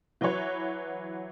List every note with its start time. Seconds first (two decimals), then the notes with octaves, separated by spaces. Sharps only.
0.21 E3 F#3 F#4 B4 C#5